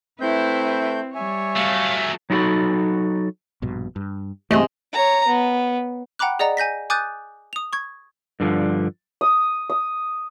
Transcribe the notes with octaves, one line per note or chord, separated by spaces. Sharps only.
A3 C4 E4 B4 G6
G3 C#5 E5 G#5
F#3 A3 F5
F#3 D#4 E4 F#4 A4 B5
A#1 G2 B2
G2
G2 C3 E3 G#3 A3 D#5
C#5 A#5
B3
F#5 G5 A#5 B5 D6 F#6
G#4 D5 D#5 F#5 A#5
G#5 G6 A#6 B6
G#5 D6 D#6 F#6 G6 A6
D#6 F7
C#6 G#6
G2 D3 F3
D#6
D#6